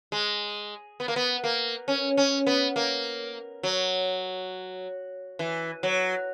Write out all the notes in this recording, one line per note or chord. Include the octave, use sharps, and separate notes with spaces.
G#3
B3
A#3
B3
A#3
C#4
C#4
B3
A#3
F#3
E3
F#3